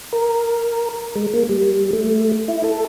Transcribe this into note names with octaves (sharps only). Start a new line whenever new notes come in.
A#4
G#3
A#3
G3
A3
E4
A4